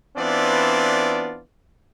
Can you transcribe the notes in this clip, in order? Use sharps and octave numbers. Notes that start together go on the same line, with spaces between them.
E3 B3 C4 D4 F4 D5